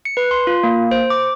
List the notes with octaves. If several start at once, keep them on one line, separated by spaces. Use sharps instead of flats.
C#7
B4
C6
F4
A#3
C5
D6